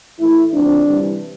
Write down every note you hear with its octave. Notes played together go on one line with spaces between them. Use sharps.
A2 E3 A3 E4
D3 F3 C4 D4
C3 E3 G3